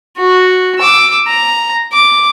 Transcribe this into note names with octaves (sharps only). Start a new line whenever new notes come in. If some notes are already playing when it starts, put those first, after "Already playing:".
F#4
D6 E6
A#5
D6